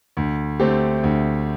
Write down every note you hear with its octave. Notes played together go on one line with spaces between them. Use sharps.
D2
D3 A3 C4 G4
D2